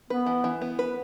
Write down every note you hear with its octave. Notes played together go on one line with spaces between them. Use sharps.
B3 B4
E3
E3
B3
B4